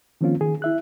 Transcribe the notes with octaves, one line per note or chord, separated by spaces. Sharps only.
D#3 F3 A#3 C4 C#4 F4
D#3 G#4
E4 E5 F#6